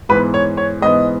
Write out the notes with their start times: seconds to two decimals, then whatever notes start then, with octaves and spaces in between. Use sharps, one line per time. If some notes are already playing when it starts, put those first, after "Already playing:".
0.09 G#2 E3 B3 B4
0.34 C#5
0.57 C#5
0.81 G#2 E3 B3 D#5